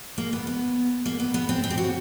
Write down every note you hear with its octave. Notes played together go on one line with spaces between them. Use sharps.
A#3
B3
B3
A#3
B3
B3
C4
C4
G4
F#4